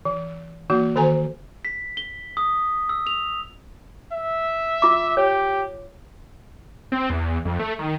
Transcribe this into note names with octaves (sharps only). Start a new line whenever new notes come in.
E3
E3 A#3 F#4
D#3 F#4 A4 C5 G#5 A#5
B6
G7
D#6
E6
F7
E5
F4 D6
G4 C#5
C4
E2
F2
A3
D#3